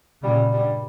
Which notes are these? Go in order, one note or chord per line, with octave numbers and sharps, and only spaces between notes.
A#2 C#3 G3
G2 G3